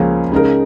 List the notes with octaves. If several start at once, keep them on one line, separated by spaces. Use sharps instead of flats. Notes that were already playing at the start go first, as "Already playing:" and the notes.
Already playing: C#2 C#3 F3 A#3 C#4
C#3 G#3 D#4 A#4